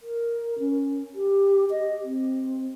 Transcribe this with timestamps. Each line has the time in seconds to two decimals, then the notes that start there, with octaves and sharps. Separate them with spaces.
0.01 A#4
0.59 C#4
1.15 G4
1.71 D#5
2.04 C4